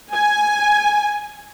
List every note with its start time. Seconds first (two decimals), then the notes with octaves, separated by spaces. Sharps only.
0.13 G#5